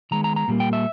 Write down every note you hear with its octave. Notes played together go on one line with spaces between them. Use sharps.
D#3 G#3 B3 A#5
A#5
A#5
A#2 G3 A#3
G5
E5